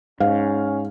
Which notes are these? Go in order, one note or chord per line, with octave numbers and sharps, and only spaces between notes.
G#2 C#4 F5